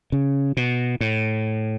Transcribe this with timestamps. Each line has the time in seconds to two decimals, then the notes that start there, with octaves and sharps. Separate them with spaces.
0.12 C#3
0.57 B2
1.01 A2